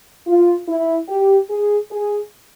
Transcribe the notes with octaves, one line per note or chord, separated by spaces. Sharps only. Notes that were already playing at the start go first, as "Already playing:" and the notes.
F4
E4
G4
G#4
G#4